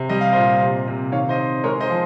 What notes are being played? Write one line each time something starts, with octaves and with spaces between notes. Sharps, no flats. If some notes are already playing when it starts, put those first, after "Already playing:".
Already playing: C3
G3 D#5
F5
A#2 C5 D#5
C3
C3
D#3 C#5 F5
C5 D#5
C4
G#3 A#4 C#5
C5 D#5
F3